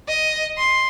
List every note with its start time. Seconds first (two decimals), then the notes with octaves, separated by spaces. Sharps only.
0.08 D#5
0.58 C6